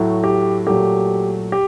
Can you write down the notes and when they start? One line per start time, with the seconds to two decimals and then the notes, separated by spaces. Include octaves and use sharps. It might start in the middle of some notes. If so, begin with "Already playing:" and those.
Already playing: A2 F#3 A3
0.24 G4
0.66 A#2 F#3 A3 G4
1.52 G4